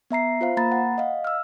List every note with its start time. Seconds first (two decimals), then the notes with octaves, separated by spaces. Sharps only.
0.11 B3 E5 A#5 C7
0.41 F4 C5 F5
0.57 A#3 A#5 B5 A6
0.72 F#5
0.98 D#5 F5
1.24 E6 F6